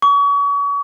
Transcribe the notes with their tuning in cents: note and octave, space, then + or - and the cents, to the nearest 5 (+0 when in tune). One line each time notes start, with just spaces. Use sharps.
C#6 +35